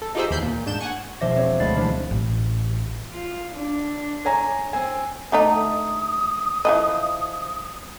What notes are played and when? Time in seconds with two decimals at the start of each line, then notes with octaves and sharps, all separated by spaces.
0.02 A4
0.15 D#4 F4 G4 G#4 C5 E5
0.31 D#2 E3 B5 G6 C7
0.42 A#2
0.66 G#2 D4 G6 E7
0.81 F#5 G#5 C#6
1.21 E1 F3 C5 E5 D6 A#6
1.36 C4 C#5
1.60 D2 G#3 B5 A6 C7
1.76 E3 F3 G3 D4 E4
2.11 A1
3.12 F4
3.53 D4
4.25 C#5 G#5 A#5
4.73 C4 G#5
5.32 D3 A3 D#4 D#6
6.65 E3 F3 D#5